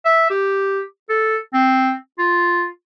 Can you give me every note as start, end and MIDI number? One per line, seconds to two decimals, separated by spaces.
0.06 0.27 76
0.30 0.81 67
1.09 1.37 69
1.54 1.94 60
2.19 2.66 65